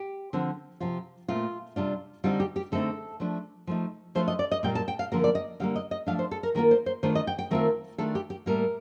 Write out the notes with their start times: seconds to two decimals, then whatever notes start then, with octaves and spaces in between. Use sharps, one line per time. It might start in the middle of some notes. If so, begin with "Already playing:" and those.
Already playing: G4
0.33 D3 F3 C4
0.80 C3 F3 C4 F4
1.28 A#2 A3 C4 F4
1.76 C3 G3 D4 F4
2.24 D3 G3 C4 D#4 F4
2.40 G4
2.56 G4
2.72 D3 A3 C4 D#4 A4
3.20 F3 A3 D4
3.67 F3 A3 D#4
4.15 F3 A3 D4 F4 C5
4.28 D#5
4.39 D5
4.51 D#5
4.63 A#2 G3 A#3 G5
4.75 A5
4.88 G5
4.99 F5
5.12 D3 F3 A#3 F4 A#4
5.24 D5
5.35 D#5
5.60 D3 G3 A#3 F5
5.76 D#5
5.91 D#5
6.06 F3 A3 D4 F5
6.19 C5
6.31 A4
6.43 A#4
6.55 D#3 A#3 F4 A#4
6.71 C5
6.86 C5
7.03 D#3 A3 D4 F4 C5
7.15 D#5
7.27 G5
7.39 G5
7.51 D#3 A3 C4 F4 A#4
7.98 D#3 A3 D4 F4 A4
8.15 G4
8.30 G4
8.46 A2 G3 A#3 A#4